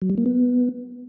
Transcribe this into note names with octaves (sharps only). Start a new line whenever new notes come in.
F#3
G3
A#3
B3